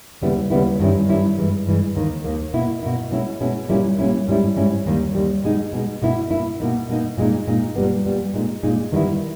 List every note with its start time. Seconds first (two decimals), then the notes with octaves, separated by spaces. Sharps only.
0.21 D#2 C#3 G3 B3 E4
0.50 D#2 C#3 G3 B3 E4
0.79 G2 D#3 G3 C#4 E4
1.08 G2 D#3 G3 C#4 E4
1.38 G2 E3 G#3
1.66 G2 E3 G#3
1.95 D#2 D#3 A#3
2.24 D#2 D#3 A#3
2.54 B2 A#3 E4
2.83 B2 A#3 E4
3.11 B2 G#3 C#4 E4
3.41 B2 G#3 C#4 E4
3.69 A#2 G3 A#3 C#4 E4
3.99 A#2 G3 A#3 C#4 E4
4.28 G#2 G3 C#4 E4
4.57 G#2 G3 C#4 E4
4.86 D#2 D#3 G3
5.15 D#2 D#3 G3
5.43 B2 G#3 D#4
5.73 B2 G#3 D#4
6.02 B2 A#3 E4
6.31 B2 A#3 E4
6.60 B2 A#3 D#4
6.89 B2 A#3 D#4
7.18 A#2 G#3 D#4
7.47 A#2 G#3 D#4
7.76 A#2 G3 B3
8.05 A#2 G3 B3
8.34 A#2 G#3 D#4
8.63 A#2 G#3 D#4
8.92 E2 D#3 G3 B3 E4